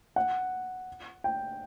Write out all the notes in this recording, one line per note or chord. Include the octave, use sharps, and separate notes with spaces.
F#5
G5